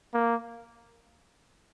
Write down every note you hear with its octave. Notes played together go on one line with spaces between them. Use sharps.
A#3